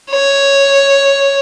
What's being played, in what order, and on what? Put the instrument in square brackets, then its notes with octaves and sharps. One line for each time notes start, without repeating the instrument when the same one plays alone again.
[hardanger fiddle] C#5